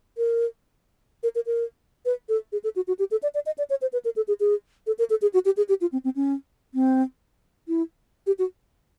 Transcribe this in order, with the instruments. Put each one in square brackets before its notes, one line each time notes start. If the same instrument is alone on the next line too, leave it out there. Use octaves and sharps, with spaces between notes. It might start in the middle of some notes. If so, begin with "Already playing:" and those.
[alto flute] A#4
A#4
A#4
A#4
B4
A4
G#4
A4
F#4
F#4
G4
A4
D5
D5
D#5
D5
C#5
C5
B4
A#4
A4
G#4
G#4
A4
A#4
A4
G#4
F#4
G4
G#4
G4
F4
C4
C4
C#4
C4
E4
G4
F#4